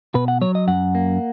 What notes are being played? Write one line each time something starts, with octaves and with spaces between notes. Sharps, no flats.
B2 B4
F#5
F#3 C#5
D#5
F#2 F#5
A#3